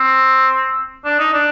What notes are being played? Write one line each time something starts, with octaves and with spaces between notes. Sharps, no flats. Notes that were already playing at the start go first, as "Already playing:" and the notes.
Already playing: C4
D4
D#4
D4